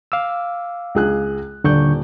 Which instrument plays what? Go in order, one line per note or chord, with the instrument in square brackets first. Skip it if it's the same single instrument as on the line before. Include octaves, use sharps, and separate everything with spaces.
[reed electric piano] F5 D6 E6
[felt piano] C#2 G#4 F#6
[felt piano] D#1 D5 [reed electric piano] D3 C#6 G6